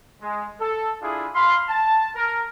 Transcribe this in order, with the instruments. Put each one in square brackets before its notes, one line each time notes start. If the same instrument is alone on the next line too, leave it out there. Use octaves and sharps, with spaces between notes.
[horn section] G#3
A4
D4 E4 F4 G#4
F5 B5 C6
A5
A#4